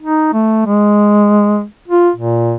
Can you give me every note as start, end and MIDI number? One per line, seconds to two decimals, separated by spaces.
0.03 0.31 63
0.33 0.65 57
0.66 1.64 56
1.88 2.10 65
2.16 2.57 46